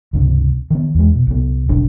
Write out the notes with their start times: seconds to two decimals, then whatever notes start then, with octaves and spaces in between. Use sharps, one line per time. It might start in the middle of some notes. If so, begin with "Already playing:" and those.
0.13 C#2 G2 C3
0.70 D#3 B3
0.95 E2 G#3
1.15 B2
1.27 C2 B3
1.69 F#1 B1 G2 D4